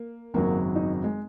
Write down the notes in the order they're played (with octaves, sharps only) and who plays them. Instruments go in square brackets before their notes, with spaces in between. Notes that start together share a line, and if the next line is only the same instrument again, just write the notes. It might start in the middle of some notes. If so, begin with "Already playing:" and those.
Already playing: [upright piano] A#3
[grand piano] G#1 F#2 C#3 F#3 [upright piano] A#3
[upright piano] D#4
G#3